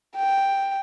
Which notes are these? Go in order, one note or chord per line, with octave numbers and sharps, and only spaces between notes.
G5